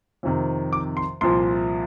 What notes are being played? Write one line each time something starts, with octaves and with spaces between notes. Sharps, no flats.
F2 C3 D#3
D6
C6
C2 A#2 F3 C6